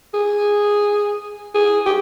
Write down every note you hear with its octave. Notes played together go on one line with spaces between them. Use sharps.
G#4
G#4
G4